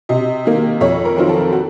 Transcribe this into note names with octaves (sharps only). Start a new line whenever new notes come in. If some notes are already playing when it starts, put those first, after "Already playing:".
C3 D#5
D#3 A#3
F2 C#5
A#4
D#3 F#3 C4 F4
A4
F#4